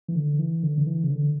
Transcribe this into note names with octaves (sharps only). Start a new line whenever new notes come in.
E3
D3
E3
D3
D3
E3
C#3
D3